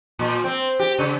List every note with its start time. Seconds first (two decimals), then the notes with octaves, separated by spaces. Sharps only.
0.19 A#2
0.44 C4
0.79 G4
0.99 C#3